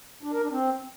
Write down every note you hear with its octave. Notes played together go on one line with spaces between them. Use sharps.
D4
A#4
D4
C4